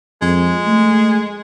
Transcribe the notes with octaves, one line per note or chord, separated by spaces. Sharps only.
F2 G#3
A3